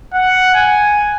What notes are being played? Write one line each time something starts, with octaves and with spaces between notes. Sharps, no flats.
F#5
G#5